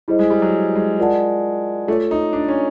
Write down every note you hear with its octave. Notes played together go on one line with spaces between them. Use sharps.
G3 E4 G#4 C5 D#5
G#3
G3
F#3
G#3
F4 A#4 D5 F#5 A5
A3 F4 A4 C#5
D#4
D4
C#4